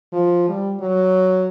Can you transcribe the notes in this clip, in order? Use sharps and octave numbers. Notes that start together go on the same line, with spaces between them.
F3
G3
F#3